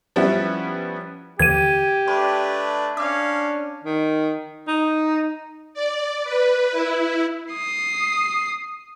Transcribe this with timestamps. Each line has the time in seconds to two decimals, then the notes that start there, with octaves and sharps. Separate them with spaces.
0.16 F3 G3 B3 C#4 E4
1.39 D#2 D3 E3 G4 G#6 D#7
2.08 A3 D4 B4 B5
2.97 C#4 D4 F5 D6 E6
3.84 D#3
4.67 D#4
5.74 D5
6.24 B4
6.72 E4
7.53 D#6 C7